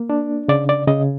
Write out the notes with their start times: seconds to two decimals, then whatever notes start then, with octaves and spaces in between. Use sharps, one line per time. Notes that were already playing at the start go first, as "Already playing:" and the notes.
Already playing: A#3
0.10 D4
0.48 C#3 D5
0.69 D5
0.88 C#3 D#5